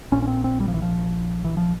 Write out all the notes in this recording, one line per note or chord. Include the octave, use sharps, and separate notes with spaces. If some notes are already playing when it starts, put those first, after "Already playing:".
A#1 A#2 C#4
C#4
C4
C4
G3
F3
E3
F3
E3
F3